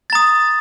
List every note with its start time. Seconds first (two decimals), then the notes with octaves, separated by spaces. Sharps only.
0.10 A6
0.13 A#5
0.15 D#6